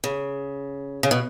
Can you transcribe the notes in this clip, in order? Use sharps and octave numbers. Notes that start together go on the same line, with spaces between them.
C#3
C#3
B2